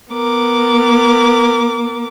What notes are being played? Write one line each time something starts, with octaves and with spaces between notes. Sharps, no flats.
B3 A#4 D6